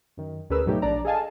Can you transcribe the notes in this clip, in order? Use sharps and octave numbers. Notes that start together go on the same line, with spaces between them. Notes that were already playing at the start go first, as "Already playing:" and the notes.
F#2 D#3
D2 C#4 G#4 A#4 B4 E6
G#2 B2 F#3 A3 D#4 G4
A#1 D4 D5 A#5
G#4 A4 D#5 F5 G#5 A5